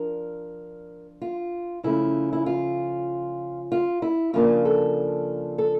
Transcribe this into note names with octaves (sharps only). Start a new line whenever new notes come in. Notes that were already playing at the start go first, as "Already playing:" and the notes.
Already playing: F3 D4 A#4
F4
C#3 F3 A3 C#4 E4
E4
F4
F4
E4
C#3 F3 A#3 D4 F4
A4
A4